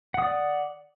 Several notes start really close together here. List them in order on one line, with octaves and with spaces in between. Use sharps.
F#5 D#6 D5